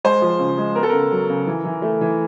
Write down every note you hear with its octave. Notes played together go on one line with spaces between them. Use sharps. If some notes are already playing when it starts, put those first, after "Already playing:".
G#3 C5
F3
C#3
G#3
B3 A#4
A4
C#3 A#4
F#3
C#3
E3
E3
A3
E3